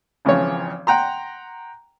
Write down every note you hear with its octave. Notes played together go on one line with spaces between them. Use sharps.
G#1 C#3 E3 F3 C#5
F#5 G5 A#5 C6